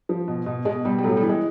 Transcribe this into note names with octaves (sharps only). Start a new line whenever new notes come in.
F3
B2
B2
B2 G#3
B2 G3
G3
A2 F#3
G3
E3
G#3